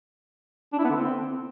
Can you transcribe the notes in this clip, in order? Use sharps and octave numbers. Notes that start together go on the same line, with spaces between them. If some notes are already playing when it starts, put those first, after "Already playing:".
D4
E4
B3
D3
C4